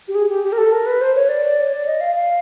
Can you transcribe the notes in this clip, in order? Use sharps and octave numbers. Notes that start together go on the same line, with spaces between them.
G4
G#4
G4
G4
A#4
A4
A#4
B4
C5
C#5
D5
C#5
D5
D#5
F5
F5